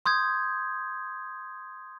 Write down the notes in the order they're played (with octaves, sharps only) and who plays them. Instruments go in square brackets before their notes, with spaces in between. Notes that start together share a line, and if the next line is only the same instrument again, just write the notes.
[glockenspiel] C6 D#6 G6 G#6